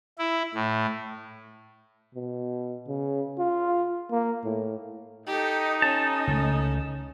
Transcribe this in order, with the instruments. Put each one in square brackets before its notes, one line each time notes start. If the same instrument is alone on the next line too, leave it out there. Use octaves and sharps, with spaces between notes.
[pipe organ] E4
A2
[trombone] B2
C#3
F4
A#3
A2
[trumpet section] D#4 [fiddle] G4 A4
[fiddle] C#4 [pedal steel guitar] A5
[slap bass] C#2 A3